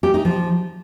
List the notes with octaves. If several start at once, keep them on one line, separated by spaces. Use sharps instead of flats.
G4
D#4
F3